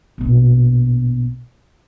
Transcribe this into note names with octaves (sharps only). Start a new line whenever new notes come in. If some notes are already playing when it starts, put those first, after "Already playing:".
A#1 B2